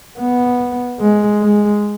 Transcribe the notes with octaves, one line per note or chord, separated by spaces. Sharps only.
B3
G#3
G#3